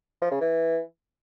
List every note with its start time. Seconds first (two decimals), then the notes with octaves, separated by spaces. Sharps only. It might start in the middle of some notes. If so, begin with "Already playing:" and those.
0.22 F3
0.31 C#3
0.41 E3